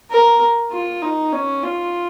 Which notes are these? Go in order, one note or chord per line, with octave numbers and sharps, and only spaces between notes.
A#4
F4
D#4
C#4
F4